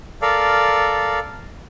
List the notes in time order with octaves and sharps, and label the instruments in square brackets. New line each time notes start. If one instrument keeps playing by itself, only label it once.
[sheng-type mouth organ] A4 A#4 D5 F5